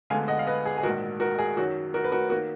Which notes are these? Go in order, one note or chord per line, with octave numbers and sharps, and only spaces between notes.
D2 D3 G#3 B3 F5 G#5
D#5 F#5
F5
B4 D#5
G#4
G#4
A#1 G#2 D#3 F#4 A#4
F#4 A#4
G#4
F#2 D#3 F#3 F#4
F#4 A#4
B4
F#4 A#4
D#3 A#3 F#4